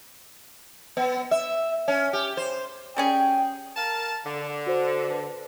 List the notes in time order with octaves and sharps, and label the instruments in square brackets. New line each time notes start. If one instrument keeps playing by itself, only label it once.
[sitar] B3
E5
C#4
G4
C5
[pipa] G3 C#4 G#4 [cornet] G5
[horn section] A#4 F5 A5
D3
[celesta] F#4 C5
B4 A5